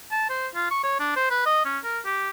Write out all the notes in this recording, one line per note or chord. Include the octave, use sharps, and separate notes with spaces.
A5
C5
F4
C#6
C#5
D4
C5
B4
D#5
C#4
A#4
G4